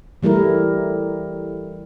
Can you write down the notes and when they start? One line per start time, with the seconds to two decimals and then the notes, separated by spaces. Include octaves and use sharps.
0.23 E3 G3 A3 E4 A#4